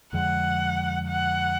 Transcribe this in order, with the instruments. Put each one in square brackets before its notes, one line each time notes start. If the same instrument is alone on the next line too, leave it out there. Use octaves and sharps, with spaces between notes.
[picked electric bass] F2 D3 F3 G#3 [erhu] F#5
[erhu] F#5